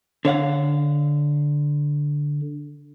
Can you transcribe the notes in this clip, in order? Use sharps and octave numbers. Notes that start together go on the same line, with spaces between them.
D3 C#5 F5 F#5